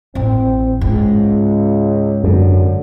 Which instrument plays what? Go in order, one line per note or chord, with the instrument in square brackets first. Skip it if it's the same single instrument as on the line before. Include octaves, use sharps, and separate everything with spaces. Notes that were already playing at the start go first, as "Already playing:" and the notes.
[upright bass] A1 [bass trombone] C4
[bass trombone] C#2 [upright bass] G#2
[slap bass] F#2 [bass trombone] D3